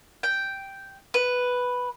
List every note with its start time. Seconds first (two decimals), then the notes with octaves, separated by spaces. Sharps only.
0.23 G5
1.14 B4